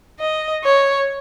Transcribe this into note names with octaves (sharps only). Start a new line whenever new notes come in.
D#5
C#5